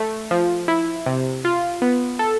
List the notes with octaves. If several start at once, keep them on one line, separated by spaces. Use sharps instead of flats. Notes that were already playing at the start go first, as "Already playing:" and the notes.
Already playing: A3
F3
E4
C3
F4
B3
A4